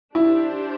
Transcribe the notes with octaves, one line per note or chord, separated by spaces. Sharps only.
D4 E4 G4 C5